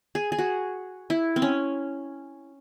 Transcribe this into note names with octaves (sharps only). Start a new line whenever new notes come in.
G#4
G#4
F#4
E4
C4
C#4